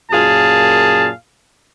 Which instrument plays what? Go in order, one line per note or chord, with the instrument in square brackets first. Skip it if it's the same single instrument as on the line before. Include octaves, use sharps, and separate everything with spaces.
[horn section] F#2 A#2 G#4 F5 A5